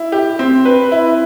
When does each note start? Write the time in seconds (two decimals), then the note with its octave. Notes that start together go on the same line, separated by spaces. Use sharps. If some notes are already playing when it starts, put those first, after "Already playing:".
Already playing: E4
0.12 G4
0.39 C4
0.65 B4
0.92 E4